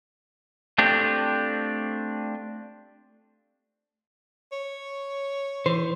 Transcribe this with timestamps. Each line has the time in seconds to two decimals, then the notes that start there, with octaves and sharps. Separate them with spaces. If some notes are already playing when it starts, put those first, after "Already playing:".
0.78 A3 C4 D4 F4 G4
4.52 C#5
5.66 E3 C5